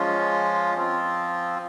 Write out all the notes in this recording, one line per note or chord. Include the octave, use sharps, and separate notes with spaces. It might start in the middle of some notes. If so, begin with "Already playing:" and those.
Already playing: F3 G#3 C#4 F4
F3 C4 F4